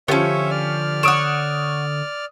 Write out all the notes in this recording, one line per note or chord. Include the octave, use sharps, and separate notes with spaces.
D3 F3 B3 C#4 F4 G4 C#5 E5
D5 F6
C#5 F#5 D#6 D7 E7